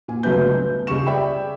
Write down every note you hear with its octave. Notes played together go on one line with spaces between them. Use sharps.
A#2 G#5
G1 C#2 F#3 A3 B4 G6
B3
C#2 C#3 G3 C#6 E7
G#4 D5 E5 G5 B5